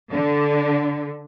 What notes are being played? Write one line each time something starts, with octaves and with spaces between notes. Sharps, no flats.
D3